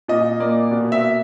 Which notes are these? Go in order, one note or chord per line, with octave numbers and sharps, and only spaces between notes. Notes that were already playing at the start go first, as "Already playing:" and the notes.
A#2 D#5
A#3 D5
B2
E5